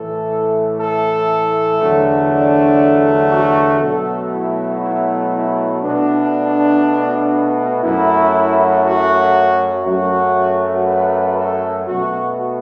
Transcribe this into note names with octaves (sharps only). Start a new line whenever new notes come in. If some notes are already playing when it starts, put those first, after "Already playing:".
Already playing: A2 E3 A3 A4
A4
E2 D3 F#3 A3
D4
F#4
B2 F#3 A3 A4
E4
E4
E4
B2 A3 D4
F#2 F#3 A3 E4
F#4
F#2 F#3 A3 F#4
B4
A4
B2 A3 F#4